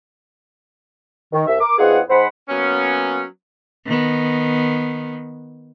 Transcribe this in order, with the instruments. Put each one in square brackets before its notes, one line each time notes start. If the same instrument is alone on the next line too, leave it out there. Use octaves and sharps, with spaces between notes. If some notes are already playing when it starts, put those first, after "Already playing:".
[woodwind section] D#3
C2 E5
A#4 D6
E2 C4 D#4 F4 G#4 F#5
G#2 C5 F#5 B5
[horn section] F#3 A#3 B3 C#4
[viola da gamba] D#3 B3